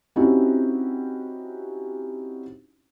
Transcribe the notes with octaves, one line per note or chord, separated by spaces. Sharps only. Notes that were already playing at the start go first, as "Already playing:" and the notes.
C4 C#4 D#4 E4 F#4 G4